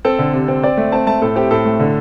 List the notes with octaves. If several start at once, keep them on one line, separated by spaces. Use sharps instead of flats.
C4 A4
D3
C3
C4
C4 D5
A3
C4 A5
A3 A5
A2 A4
C4 G4
A2 A4
A3
D3